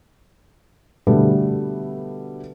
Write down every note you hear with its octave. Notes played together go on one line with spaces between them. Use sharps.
B2 D3 G3 A3 B3